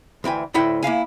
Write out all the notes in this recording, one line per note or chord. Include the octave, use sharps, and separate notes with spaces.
D2 E3 G5 G#5
D2 A2 E4 F#5 G5
A#3 E4 F5 G#5